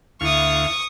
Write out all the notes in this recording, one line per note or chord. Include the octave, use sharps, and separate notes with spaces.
D2 E4 F5 C#6 D#6